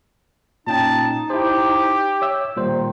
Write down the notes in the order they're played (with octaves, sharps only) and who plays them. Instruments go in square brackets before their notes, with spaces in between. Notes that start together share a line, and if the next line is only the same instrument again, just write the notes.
[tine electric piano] A#2 C#4 G5 [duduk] D#4 [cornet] A5
[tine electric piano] E4 C5 [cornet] G4
[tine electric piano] C#5 E5 E6
[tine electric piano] A#2 G3 C5 [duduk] D#3